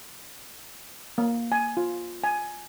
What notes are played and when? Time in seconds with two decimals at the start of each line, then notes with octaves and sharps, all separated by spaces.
1.18 A#3
1.52 G#5
1.77 F4
2.24 G#5